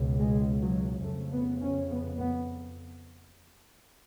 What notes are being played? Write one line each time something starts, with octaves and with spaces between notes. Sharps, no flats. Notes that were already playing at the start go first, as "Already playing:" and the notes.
Already playing: C#2 B2
G#3
F#3
F2 C#3 A3
B3
C#4
B3
B3